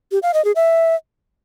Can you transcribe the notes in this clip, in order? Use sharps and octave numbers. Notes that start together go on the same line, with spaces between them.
G4
F5
D#5
G#4
E5